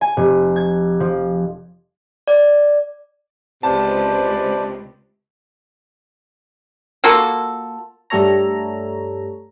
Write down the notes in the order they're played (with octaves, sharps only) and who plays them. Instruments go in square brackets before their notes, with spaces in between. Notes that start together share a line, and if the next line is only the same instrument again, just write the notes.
[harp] G#5
F1
G#6
F3
[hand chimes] D5
[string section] C#2 [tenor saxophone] C3 [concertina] B4 C5 D5 [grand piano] A5
[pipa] A#3 F4 F#4 A4
[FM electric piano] G2 G3 A3 A4 C#5 A#5